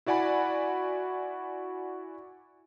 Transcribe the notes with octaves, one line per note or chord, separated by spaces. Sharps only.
E4 F#4 D5 F#5 G#5 B5